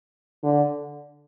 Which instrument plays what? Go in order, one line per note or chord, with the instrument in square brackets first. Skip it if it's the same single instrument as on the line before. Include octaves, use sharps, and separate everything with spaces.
[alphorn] D3